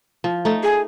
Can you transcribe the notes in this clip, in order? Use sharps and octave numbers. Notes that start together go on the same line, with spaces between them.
F3
A3 D#4 A4
G#4